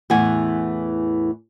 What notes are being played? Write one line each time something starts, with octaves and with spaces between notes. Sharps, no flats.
E2 A2 E3 F#5 G#5